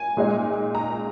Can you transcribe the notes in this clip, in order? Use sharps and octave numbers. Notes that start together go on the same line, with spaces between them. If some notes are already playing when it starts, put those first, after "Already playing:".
Already playing: G#5
A#2 G#3 D#4
A#5